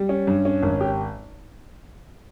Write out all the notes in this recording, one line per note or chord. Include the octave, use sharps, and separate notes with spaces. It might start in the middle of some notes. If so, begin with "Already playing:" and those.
Already playing: G3
C#4
G2
C#4
G#1
G4